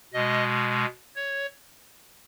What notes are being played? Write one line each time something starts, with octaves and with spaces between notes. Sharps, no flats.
B2 G#3 D#5
C#5